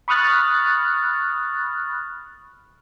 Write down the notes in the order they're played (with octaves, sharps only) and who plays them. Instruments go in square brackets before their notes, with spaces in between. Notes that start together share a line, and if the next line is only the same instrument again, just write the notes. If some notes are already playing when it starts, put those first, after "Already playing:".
[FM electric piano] B5 C#6 D#6 F6 F#6 A6